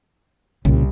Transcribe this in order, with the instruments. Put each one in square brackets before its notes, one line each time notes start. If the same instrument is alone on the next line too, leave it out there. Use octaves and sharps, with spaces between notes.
[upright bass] C2 [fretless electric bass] A#2 C#3